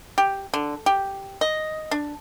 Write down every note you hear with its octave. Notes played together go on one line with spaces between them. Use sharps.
G4
D3
G4
D#5
D4